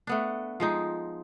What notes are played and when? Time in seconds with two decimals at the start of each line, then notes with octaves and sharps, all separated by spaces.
0.07 A3 B3 D4
0.60 F3 G#3 D#4